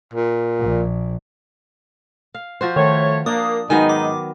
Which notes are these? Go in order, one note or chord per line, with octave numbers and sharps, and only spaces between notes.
A#2
A#1
F5
F3 F#4 C5
D#3 A3 C#5
A#3 D4 D#6
G#2 D#3 F#3 B3 D#4 G#5
D6